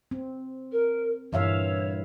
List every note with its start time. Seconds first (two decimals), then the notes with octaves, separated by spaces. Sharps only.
0.11 C4
0.72 A#4
1.33 G2 A#2 E3 C#5 E5 F5